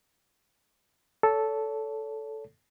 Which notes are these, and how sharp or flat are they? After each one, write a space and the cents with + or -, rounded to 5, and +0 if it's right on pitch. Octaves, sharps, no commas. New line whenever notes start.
A4 -5 C#5 +35